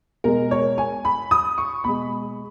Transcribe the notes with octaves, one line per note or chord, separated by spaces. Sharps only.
B2 G#3 A#4
C#5
G#5
B5
D#6
C#6
B2 G#3 B5